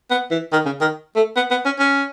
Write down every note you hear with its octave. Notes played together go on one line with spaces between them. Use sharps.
B3
E3
D#3
C#3
D#3
A3
B3
B3
C#4
C#4